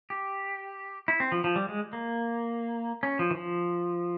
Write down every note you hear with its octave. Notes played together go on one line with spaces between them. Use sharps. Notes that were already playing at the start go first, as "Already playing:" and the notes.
G4
E4
C4
F3
F3
G3
G#3
A#3
C#4
F3
E3
F3